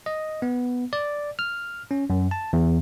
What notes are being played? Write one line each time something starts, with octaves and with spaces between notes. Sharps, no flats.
D#5
B3
D5
F6
C#4
F#2
A5
E2